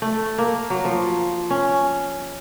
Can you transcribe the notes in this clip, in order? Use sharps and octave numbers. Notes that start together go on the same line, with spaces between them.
A3
A#3
F#3
F3
C#4